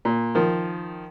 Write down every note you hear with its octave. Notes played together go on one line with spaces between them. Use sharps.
A#2
D#3 F3